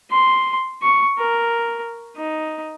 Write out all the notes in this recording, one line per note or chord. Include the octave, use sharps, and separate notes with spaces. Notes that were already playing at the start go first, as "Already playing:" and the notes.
C6
C#6
A#4
D#4